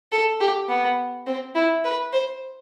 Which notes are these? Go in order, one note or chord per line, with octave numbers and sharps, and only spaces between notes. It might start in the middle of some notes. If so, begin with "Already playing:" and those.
A4
G4
B3
C4
E4
B4
C5